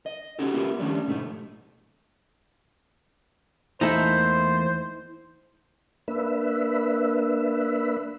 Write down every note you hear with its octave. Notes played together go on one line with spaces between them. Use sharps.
D#5
C#4 D#4 F#4 G4 A4
B3 E4 F4 G4 A#4
D#3 F3 G3 A3 C#4 D4
G#2 B2 A3 B3 D#4
E2 A3 A#3 D#4 E4 A4 C5
A#3 D4 B4 E5